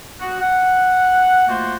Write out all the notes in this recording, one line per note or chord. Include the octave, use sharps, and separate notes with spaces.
B3 F#4
F#5
A3 A#3 F4 F#4 C5